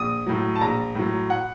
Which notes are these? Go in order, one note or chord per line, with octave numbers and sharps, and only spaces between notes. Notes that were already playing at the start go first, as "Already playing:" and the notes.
Already playing: A#1 D#6
A2 F#3
A5
A#1 A#5
A2 F#3
F#5